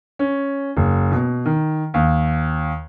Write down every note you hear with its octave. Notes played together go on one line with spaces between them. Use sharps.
C#4
F#1
B2
D#3
D#2